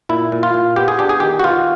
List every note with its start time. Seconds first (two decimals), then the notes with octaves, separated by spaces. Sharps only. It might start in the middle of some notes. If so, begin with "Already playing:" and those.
0.09 A#2 E4
0.32 A#2
0.43 F4
0.54 A#2
0.76 B3 G4
0.88 G#4
0.99 D4 G4
1.09 G#4
1.20 D#3 G4
1.39 F#4
1.44 B3 F4